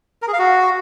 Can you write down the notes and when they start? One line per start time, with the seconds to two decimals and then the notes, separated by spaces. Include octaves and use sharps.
0.22 A#4
0.28 G#4
0.33 F5
0.39 F#4